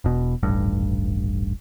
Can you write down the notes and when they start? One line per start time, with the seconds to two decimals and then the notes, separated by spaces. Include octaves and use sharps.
0.04 E1 B2
0.43 D#1 A1 G2